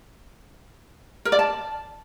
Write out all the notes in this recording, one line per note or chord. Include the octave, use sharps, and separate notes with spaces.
A#4
D5
A5